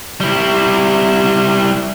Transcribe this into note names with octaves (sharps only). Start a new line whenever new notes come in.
G3 E4